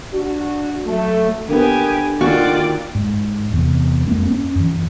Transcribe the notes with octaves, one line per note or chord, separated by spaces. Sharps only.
D4 F#4
F#3 A3
D3 A#3 B3 G4 G#5
D#2 F4 F#4 D5
G#2
E2 C3
F2 G#3 A#3 C4
C#4
F#2 E3